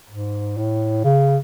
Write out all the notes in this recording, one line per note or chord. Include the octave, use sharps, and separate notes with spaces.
G#2
A2
C#3